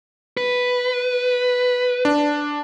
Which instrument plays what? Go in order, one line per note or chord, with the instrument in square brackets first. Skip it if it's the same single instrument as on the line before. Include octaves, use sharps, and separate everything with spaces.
[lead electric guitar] B4
[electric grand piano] D4